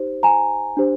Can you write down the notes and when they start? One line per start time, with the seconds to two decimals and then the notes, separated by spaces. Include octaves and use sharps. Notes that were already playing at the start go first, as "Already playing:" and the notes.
Already playing: D#4 G4 C5
0.23 G#5 A#5
0.77 D4 G4 C5